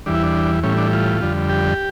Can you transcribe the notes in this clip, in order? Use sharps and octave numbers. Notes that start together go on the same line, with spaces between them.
E2 E3 G3 D4
E4
D4
A2 E3 G3 C#4
D4
F4
F2 D3 G3
G4